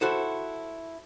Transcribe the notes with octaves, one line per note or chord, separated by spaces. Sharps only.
E4 F#4 A4 C5